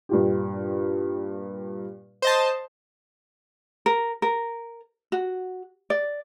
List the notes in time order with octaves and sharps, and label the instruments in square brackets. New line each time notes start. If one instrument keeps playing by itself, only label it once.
[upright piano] G2 A#2 G4
[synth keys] C5 D#5 A5
[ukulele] A#4
A#4
F#4
D5